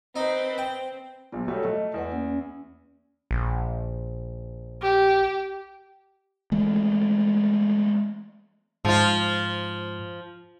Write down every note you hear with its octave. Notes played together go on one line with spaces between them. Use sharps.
C4 D#4 B4
C4 G5
A#1 A#2 F#3 B3
F#3 G3 A3 F#4 A4 C#5
A3 D#5
E2 E4 B4 F#5
A#3 C#4
C#4
A#1
G4
E3 G#3 A3
G#2 F3 F4